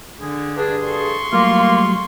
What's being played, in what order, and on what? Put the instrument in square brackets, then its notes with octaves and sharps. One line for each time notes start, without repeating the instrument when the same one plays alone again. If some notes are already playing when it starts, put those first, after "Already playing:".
[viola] D3 [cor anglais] G#4
[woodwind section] G2 G#4 [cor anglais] D4
[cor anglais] A4 [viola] C6 C#6
[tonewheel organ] F#3 G3 A3 [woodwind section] A#3 [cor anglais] F4